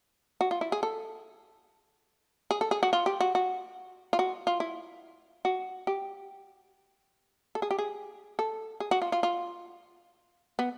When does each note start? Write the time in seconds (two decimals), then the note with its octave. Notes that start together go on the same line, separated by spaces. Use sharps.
0.41 F#4
0.51 F4
0.61 E4
0.72 G#4
0.83 A4
2.51 G#4
2.61 A4
2.71 G#4
2.83 F#4
2.93 F4
3.06 G4
3.20 F#4
3.35 F#4
4.13 F4
4.19 F#4
4.47 F4
4.60 E4
5.45 F#4
5.87 G4
7.55 A4
7.62 G#4
7.71 G4
7.79 G#4
8.39 A4
8.80 G#4
8.91 F#4
9.02 F4
9.12 F4
9.23 F4
10.59 B3